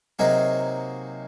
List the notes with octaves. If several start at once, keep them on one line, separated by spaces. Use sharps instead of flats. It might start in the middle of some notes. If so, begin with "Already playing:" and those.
C3 F#3 A#3 D#4 G#4